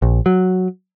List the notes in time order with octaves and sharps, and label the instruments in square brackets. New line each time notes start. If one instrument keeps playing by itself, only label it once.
[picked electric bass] A#1
F#3